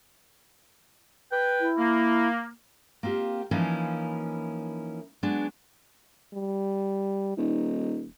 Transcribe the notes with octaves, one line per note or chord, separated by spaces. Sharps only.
B4 G5
E4
A#3
A#3 C4 F4 G4
E3 F3 A#3 C#4 D#4 E4
F#3 G#3 B3 D4
G3
D#1 D#4